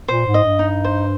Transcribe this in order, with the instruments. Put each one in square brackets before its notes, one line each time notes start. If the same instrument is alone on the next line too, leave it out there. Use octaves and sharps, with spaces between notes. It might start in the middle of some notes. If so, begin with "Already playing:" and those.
[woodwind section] A#2 [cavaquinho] C5
[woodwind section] G#2
[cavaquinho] D#5
[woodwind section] G2
[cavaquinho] D#4
C5